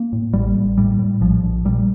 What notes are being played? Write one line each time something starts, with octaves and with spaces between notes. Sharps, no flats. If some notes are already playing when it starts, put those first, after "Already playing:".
Already playing: A#3
A2
A1 G3
A1
A2 G3
A2
A#1 F3
A#1
A#2 G3